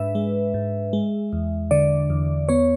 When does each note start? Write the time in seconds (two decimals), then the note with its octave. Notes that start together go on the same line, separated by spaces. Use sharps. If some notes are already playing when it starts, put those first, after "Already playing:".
Already playing: G#2 D4 B4 E5
0.15 G#3
0.54 G#2
0.93 G#3
1.33 E2
1.71 D3 D5
2.10 E2
2.49 B3 C#5